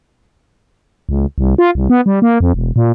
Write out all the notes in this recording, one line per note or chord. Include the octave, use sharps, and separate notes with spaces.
C#2
C2
F4
C2
B3
G3
A#3
F2
E1
A#2